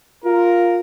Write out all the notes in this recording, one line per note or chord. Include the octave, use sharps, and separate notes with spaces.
F4 A#4